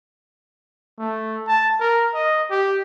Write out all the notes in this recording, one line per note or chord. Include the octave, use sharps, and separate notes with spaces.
A3
A5
A#4
D#5
G4